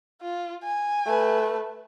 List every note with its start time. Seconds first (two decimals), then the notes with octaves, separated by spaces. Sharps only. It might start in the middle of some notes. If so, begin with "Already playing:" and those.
0.22 F4
0.64 G#5
1.05 A3 B4